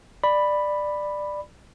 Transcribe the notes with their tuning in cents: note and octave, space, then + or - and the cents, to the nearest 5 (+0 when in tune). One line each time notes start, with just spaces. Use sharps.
D5 +15 B5 +0